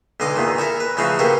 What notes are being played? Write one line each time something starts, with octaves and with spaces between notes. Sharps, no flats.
B1 D3 D#5 C6 D6
E2 A#2 D#3
E4 A4 A#4
B4
A1 C#3 F3 D#4 G#4 F#5
B2 A#3 E4 G4 A#4